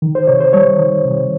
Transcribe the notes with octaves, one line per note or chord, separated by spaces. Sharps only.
D#3
C5
C3 C#5
C5
G3 C#5
D#3
C3